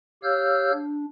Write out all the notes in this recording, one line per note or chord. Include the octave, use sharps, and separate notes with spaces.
G4 C#5 F5 E6 F6 G6
D4